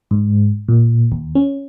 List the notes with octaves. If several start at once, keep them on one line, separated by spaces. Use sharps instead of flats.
G#2
A#2
D#2
C#4